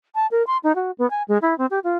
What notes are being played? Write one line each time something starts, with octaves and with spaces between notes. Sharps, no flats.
A5
A#4
C6
D#4
F#4
B3
G#5
G#3
E4
C4
G4
F4